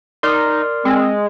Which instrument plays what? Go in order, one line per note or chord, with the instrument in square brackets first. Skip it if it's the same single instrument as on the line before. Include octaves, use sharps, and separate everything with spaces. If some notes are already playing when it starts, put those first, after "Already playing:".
[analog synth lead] D#4 [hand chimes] A#4 F6 [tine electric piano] D5 C6
[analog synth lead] G#3 [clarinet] C4